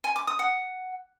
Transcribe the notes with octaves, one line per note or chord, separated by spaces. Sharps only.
G#5
D6
D#6
F#5